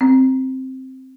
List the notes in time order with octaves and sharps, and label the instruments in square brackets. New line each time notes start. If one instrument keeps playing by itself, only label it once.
[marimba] C4